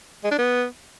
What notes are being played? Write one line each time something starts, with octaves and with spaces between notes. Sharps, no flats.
G#3
D4
B3